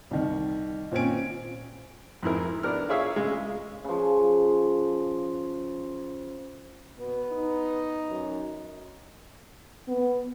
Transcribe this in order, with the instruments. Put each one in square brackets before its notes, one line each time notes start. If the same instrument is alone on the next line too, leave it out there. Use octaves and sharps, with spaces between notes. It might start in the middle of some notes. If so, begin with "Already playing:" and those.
[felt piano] C2 D#3
A#2 C4 C#4 G#5 D7
[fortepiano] F2 G#2 E4 A#4
B3 D4 A#4 F6
F4 G#4 C#5 E5 F5
C#3 G#3
[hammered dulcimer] C#3 F3
[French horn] B2 [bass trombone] B3
[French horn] D#4
[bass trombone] F#2
[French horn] B3